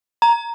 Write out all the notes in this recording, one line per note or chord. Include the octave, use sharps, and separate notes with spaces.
A#5